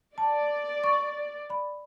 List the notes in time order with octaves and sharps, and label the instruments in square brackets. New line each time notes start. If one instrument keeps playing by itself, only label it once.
[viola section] D5 [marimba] A5
[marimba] C#6
D5 B5